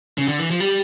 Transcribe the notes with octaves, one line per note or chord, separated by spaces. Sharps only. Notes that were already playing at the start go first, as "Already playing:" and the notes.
C#3
D3
E3
F3
G3